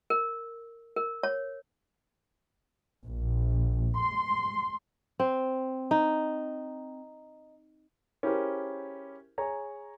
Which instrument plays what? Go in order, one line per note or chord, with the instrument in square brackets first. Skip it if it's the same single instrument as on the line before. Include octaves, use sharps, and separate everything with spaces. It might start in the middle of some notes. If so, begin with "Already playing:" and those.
[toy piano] A#4
A#4
C#5
[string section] A#1
C6
[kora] C4
D#4
[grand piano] C#4 E4 G4 G#4 A#4 C5
G#4 C#5 G#5 A#5